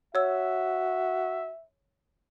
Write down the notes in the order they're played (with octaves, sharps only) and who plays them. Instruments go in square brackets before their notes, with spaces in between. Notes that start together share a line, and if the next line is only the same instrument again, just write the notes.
[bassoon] F#4 [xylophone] C#5 E6 [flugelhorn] E5